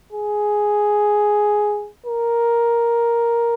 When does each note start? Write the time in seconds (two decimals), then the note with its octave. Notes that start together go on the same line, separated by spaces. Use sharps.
0.13 G#4
2.06 A#4